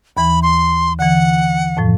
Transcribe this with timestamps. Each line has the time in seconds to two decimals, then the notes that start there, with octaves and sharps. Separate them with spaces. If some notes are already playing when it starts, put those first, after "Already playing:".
0.17 D#2 E3 B5
0.42 C6
0.99 D3 E3 F#5
1.77 F2 A2 F3